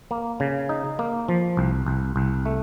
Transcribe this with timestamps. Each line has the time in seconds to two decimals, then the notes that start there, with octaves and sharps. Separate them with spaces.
0.11 A#3
0.40 C#3
0.69 D#4
0.99 A#3
1.29 F3
1.57 C2
1.86 C2
2.16 C2
2.46 A3